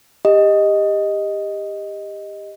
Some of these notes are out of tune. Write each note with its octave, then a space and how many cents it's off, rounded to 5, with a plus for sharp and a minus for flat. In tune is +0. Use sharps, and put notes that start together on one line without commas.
G4 +25 D#5 +0